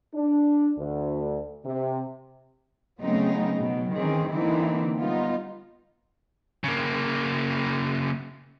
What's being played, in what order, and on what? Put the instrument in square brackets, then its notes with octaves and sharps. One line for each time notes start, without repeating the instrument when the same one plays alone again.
[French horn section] D4
D2
C3
[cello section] C#3 F#3 A3 B3 C4 D#4
B2 F#3
D#3 E3 C4 C#4 G#4
D3 E3 A#3 C4 D#4 E4
G3 B3 D#4 F4
[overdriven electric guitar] C#3 A#3